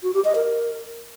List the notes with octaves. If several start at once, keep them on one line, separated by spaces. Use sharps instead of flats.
F#4
G4
D#5
A#4